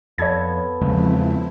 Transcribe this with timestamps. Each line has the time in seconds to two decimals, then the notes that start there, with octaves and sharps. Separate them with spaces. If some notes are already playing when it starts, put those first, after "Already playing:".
0.18 F2 B3 A4 C#5 G#6
0.81 E2 C#3 F3 G#3 C4 E4